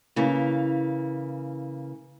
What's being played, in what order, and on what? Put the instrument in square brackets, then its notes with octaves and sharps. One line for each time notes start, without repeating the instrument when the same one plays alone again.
[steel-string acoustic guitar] C#3 E3 A#3